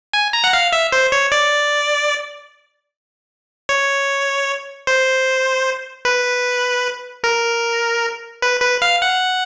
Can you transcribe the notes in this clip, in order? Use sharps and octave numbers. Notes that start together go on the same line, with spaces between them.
G#5
A#5
F#5
F5
E5
C5
C#5
D5
C#5
C5
B4
A#4
B4
B4
F5
F#5